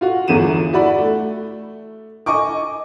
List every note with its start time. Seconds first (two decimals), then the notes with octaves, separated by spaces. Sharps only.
0.01 F4 F#4
0.28 G1 E2 D3 E3 D#7 E7
0.73 E4 F#4 D5 B5
0.98 A3
2.26 D#5 G#5 C#6 D6